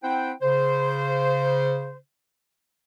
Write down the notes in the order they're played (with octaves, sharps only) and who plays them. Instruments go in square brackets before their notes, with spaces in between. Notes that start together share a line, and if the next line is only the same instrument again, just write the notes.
[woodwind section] C4 E4 C5 F#5 G5
C#3 C5